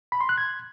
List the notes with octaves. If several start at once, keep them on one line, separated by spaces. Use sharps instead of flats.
B5
C6
F#6
G#6